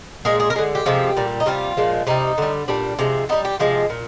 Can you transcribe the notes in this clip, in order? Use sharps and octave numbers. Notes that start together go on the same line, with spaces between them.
A#2 G#3 G#4
G#4
A#4
D3 G#3 G#4
G4
C3 F3 G#3
A#2 G3
D#4
C3 G3 F4
A#2 F3 G#3
C3 G3 D#4
D3 G3
A#2 G3 D4
C3 F3 G#3
D3 G3 D#4
G4
C3 F3 G#3
A#2